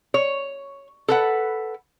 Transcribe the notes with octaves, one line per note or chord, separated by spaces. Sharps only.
C#5
A4 B4 F#5